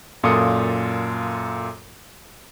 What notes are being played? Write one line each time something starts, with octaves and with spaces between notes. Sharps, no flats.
F#2 A#2 F4 A4 D#6 C#7